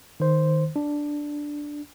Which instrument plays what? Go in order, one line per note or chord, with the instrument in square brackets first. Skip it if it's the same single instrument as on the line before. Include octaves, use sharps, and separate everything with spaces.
[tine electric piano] D#3 C5
D4